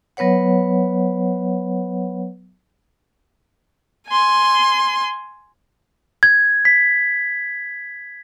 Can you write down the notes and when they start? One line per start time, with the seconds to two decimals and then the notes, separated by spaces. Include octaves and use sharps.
0.17 F#3 B3 B4 C#5 F#5
4.08 G#5 C6
6.23 G#6
6.65 B6